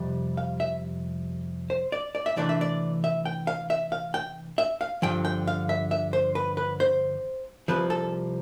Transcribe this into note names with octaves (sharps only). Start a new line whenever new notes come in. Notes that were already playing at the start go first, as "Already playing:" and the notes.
Already playing: F2 C3 G3
F5
E5
C5
D5
D5
E5
C3 E3 A3 D4 D5
E5
D5
E5
G5
F5
E5
F5
G5
E5
F5
G2 D3 F3 G5
G5
F5
E5
E5
C5
B4
B4
C5
C2 C3 F3 B4
A4